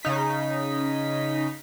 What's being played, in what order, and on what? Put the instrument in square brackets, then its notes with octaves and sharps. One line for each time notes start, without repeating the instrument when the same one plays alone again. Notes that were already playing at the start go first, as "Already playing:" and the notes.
[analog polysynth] C#3 D#4 B6